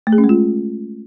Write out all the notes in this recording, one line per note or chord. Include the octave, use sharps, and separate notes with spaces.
A3
G#4
C#4
G#3
F4